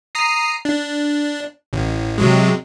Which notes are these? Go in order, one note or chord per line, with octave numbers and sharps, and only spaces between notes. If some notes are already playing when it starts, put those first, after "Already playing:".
A#5 D#6 C7
D4
A1
C3 F#3 G#3